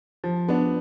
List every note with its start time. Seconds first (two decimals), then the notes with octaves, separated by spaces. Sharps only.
0.24 F3
0.48 B3 D4